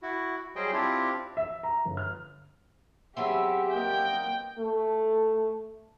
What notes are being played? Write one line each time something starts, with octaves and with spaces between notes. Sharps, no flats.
E4 F#4
F#3 G3 G#4 C5 D#5 G5
C4 D4 E4 F4 G4
E5
A#5
G1
F6
F#3 B3 C4 G4 G#4 E5
A#3 A#4 D#5 G5
A3